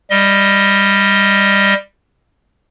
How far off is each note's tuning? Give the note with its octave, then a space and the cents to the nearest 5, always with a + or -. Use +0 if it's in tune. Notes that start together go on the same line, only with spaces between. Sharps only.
G3 +15 D#5 +15